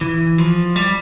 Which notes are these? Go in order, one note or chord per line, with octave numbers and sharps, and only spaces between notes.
E3
F3
G3